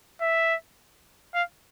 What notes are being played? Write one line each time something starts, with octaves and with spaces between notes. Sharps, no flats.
E5
F5